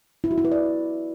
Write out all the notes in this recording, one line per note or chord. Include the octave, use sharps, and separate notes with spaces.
E4
F#4
E4
B4
D5